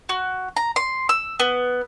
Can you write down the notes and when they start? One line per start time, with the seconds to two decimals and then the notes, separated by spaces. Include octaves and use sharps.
0.09 F#4
0.57 A#5
0.76 C6
1.09 E6
1.40 B3